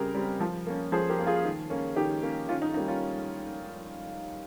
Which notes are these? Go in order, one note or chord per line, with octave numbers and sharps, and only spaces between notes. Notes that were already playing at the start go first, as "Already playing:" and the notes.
Already playing: C#3 G3 C4 G4 G#4 A#4
G3 C4
F3
A#3 C#4
F3 G#4 C5
G4 A#4
A#3 C#4
F4 G#4
D#3
A#3 C#4
D#3 D#4 G4
A#3 C#4
D#3 C#4 F4
D#4
G3 A#3 C#4 D#4
C#4 F4